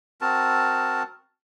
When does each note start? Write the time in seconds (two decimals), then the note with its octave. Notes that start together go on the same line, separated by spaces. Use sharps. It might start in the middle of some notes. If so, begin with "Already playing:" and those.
0.21 C4 F#4 A#4 A5